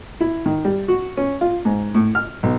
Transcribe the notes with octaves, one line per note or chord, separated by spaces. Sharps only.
E4
D#3
G3
F#4
C#4
F4
G#2
A2
F6
B1